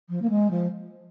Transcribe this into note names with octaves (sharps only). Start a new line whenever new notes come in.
F3
A#3
G#3
F3